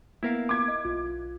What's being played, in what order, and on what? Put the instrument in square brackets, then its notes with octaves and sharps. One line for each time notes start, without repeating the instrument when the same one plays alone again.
[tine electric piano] A#3 B3 [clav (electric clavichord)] E4 A#4 F5
[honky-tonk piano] D6 G#6
[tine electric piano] D#5
B1 F4